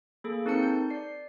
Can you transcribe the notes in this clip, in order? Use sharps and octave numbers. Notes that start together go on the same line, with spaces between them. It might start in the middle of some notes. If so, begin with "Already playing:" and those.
A#3 G#4 A4
C4 D#4 A#4 C5 A5 C#7
G6
D5 C7